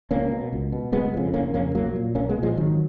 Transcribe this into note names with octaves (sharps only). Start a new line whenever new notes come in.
C#2 A#3 C#4
B2
C#2
B2
F#1 G#3 B3
F2 C#3
F#1 A#3 C#4
F2 C#3 A#3 C#4
B1 F#3 A#3
A#2
B1 A#3 C#4
G#3 B3
A#2
F3 G#3
G#1 D#3 F#3